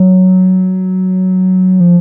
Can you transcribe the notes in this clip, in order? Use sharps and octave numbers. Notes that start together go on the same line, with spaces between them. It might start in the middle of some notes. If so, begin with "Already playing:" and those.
Already playing: F#3
F3